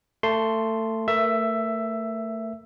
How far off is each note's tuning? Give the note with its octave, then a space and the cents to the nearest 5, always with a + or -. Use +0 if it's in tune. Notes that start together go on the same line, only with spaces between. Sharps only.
A3 +25 A5 +0 C6 +0
A3 +30 A#4 +35 E5 +10